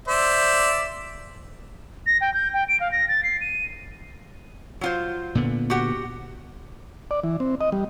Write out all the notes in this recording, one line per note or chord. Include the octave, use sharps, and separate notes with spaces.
C5 D5 E5
A#6
G5
G6
G5
D7
F5
A#6
A6
C7
D#7
F#3 F4 C5
A#2 D3 B3
F#4 G4 F#5
D5
E3
C4
D#5
G3